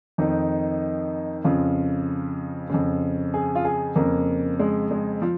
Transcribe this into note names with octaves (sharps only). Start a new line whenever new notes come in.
F2 D#3 D#4
F2 C#3 F4
F2 C#3
G#4
F4
G#4
F2 C#3 A#3
G#3
G#3
F3